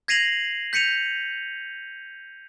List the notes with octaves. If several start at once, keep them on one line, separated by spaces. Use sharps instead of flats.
G#6 A#6 C7 D#7 F7 F#7
G6 B6 C#7 D#7 F7